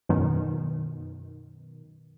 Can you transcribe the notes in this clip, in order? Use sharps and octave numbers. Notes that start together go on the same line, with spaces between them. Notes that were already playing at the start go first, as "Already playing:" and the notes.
F#2 B2 D#3